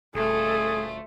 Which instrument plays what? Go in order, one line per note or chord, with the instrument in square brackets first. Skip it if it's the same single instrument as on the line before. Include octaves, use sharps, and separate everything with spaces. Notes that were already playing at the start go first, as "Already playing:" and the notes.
[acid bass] D#1 [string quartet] D2 A3 F4 [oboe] G#4 [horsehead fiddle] A4